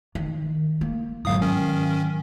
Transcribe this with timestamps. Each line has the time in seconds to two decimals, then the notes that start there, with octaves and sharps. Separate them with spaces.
0.15 D#3
0.81 A#3
1.25 G1 G#2 F#3 F5 D#6
1.42 D#3 C#4